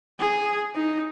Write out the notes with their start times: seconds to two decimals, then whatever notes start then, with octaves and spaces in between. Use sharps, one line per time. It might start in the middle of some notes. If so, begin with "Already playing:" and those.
0.19 G#4
0.75 D#4